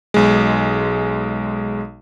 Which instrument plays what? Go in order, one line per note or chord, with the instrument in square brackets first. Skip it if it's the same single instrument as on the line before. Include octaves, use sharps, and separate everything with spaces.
[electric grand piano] B1 G#3